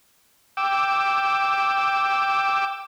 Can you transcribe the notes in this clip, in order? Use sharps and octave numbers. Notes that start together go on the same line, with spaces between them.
G5 D6 E6